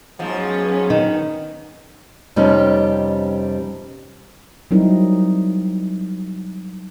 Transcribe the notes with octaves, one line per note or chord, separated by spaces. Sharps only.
G#2 F3 F#3 B3 C#4
D#3
F2 C3 G3 B3 C#4 D#4
F#3 G3 C4 D#4 E4 A#4